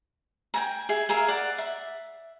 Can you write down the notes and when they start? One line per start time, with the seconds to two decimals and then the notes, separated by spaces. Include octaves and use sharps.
0.54 G5 G#5 A#5
0.89 G#4 E5
1.09 G#4 A#4 E5 F5
1.28 D5 F#5
1.58 E5